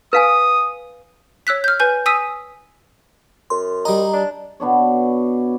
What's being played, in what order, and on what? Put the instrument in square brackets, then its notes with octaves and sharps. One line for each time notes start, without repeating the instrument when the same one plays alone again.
[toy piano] B4 F5 G#5 [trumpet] D#6
[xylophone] C#5 E6 F#6 B6
F6 G6
B4 G#5 G6
G#5 D#6 E6 B6 D#7
[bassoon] F#2 [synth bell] C6
[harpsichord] G3 D#5 [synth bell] A#5
[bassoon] D4
[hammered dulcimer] B2 B3 D4 C#5